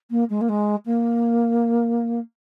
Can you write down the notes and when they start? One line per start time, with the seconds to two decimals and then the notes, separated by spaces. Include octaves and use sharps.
0.11 A#3
0.30 G#3
0.41 A#3
0.49 G#3
0.86 A#3